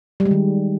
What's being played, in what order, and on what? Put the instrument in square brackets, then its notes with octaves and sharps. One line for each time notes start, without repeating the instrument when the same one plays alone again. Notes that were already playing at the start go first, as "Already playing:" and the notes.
[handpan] G3
G#3
D#3